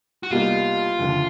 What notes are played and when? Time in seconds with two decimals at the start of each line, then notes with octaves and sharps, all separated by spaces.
0.23 F#4
0.31 C2 B2 G3 A#3 D#4 F4
0.99 F#1 F2 D3